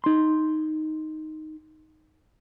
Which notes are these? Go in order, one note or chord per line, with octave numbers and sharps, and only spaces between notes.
D#4 C6